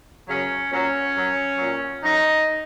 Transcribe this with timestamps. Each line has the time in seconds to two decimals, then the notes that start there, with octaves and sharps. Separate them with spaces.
0.27 F#2 C#3 F#3 C#4
0.71 A#2 F#3 C#4
1.14 F#2 F#3
1.58 A#2 F#3
2.02 F#2 F#3 D#4